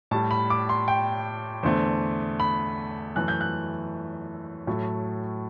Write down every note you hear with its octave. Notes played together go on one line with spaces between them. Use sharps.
A2 G3 A5
B5
D6
C6
G5
E2 D3 A3 C5
B5
F#2 E3 A3 F#6
G6
F#6
A2 F#3 A3